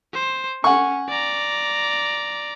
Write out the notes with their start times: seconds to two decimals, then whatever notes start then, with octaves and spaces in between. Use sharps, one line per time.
0.14 C5
0.64 C#4 F#5 G#5 C#6
1.09 D5 A#5